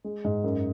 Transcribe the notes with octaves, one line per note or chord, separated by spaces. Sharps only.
G#3
G#2
F#2